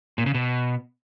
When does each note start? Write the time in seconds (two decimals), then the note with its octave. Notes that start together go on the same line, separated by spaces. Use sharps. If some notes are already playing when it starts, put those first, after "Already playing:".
0.18 A#2
0.26 C#3
0.34 B2